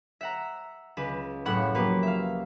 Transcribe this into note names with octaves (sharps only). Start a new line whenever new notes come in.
E5 F#5 A#5
C#2 B4 E7
F#1 A2 F#5 B5 C#6 E7
F3 A#3 B3 F#4 G4 B4
E5 F5